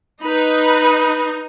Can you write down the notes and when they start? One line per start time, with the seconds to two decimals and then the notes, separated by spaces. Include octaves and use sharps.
0.24 D#4 B4